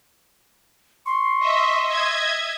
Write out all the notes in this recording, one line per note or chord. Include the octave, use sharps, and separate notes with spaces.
C6 C#6
D#5 E5
D#5 E5 G#6